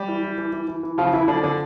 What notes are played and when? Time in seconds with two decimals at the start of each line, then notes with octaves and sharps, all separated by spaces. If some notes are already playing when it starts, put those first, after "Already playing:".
Already playing: G3 G4
0.08 E3
0.23 E3
0.38 E3
0.53 E3
0.68 E3
0.83 E3
0.98 C#3 F3 F4
1.13 C#3 E3 E4
1.28 D3 F3 D4
1.43 D3 D4